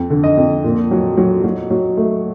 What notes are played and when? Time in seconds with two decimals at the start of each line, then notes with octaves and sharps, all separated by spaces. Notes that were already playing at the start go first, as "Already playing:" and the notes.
Already playing: F2
0.10 D3
0.24 D#5
0.37 F2
0.64 A#2
0.91 F#3
1.17 F#3
1.44 F#3
1.70 F#3
1.97 A3